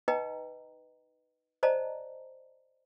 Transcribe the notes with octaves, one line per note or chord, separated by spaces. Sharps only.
D#4 B4 D#5 G5 A#5
C5 D5 D#5 A5 A#5